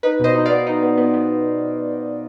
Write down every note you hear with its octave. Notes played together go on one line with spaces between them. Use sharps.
D#4 B4
B2 C5 D#5
D#4
B3 D5 F5
D#4
B3
B3
B3